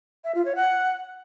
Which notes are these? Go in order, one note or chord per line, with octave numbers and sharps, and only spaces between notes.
E5
F4
C#5
F#5